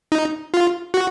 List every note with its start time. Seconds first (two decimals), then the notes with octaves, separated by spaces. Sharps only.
0.12 D#4
0.54 F4
0.94 F#4